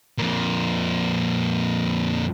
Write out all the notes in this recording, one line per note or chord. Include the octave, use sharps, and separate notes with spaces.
F2 A#2